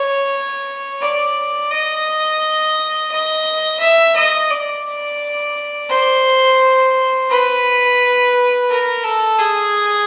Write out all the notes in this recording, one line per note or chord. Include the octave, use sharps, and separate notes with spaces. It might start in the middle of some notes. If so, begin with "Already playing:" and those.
Already playing: C#5
D5
D#5
D#5
E5
D#5
D5
C5
B4
A#4
A4
G#4